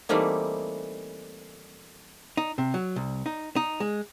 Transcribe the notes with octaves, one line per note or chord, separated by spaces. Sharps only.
E3 G3 A3 A#3 C4 D#4
D#4
C3
F#3
C2
D#4
D#4
G#3